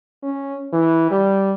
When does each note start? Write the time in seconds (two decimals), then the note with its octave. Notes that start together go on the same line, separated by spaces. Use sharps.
0.23 C#4
0.73 E3
1.11 G3